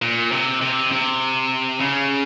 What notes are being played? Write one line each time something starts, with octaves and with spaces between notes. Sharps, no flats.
A#2
C3
C3
C3
C#3